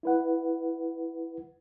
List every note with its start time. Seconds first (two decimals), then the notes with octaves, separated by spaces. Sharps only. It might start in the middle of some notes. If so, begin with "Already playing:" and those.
0.03 E4 B4 F#5